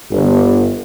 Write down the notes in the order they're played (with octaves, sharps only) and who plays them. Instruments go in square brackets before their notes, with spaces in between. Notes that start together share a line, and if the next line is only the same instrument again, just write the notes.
[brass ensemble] G1